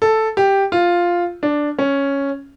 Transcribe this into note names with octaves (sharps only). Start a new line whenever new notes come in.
A4
G4
F4
D4
C#4